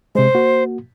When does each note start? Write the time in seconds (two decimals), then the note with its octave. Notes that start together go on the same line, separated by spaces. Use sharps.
0.15 C3 G#3 C5
0.35 A#3 F#4